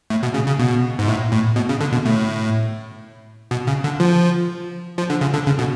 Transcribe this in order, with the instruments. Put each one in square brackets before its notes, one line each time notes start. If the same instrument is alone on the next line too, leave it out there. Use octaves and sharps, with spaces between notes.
[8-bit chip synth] A2
B2
C#3
C#3
B2
G#2
A2
A2
B2
C#3
D3
B2
A2
B2
C#3
D3
F3
F3
D3
C#3
D3
C#3
B2